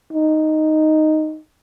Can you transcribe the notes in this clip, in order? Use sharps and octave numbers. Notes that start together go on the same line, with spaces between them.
D#4